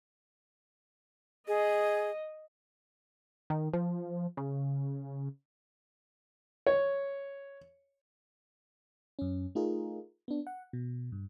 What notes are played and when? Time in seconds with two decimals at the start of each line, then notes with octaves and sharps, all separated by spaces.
1.48 G#4 D#5
3.50 D#3
3.73 F3
4.37 C#3
6.67 C#5
9.19 F#2 C#4
9.55 A3 D#4 F4 G#4 A#4
10.28 B3 D4
10.47 F#5
10.73 B2
11.12 G2